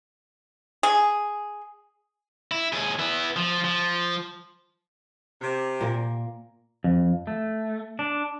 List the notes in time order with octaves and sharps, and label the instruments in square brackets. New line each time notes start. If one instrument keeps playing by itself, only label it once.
[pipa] G#4
[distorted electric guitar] E4
D#2 G#4
B3 E4
F3
F3
[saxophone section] C3
[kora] A#2 A#3
[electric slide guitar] F2
A3
D4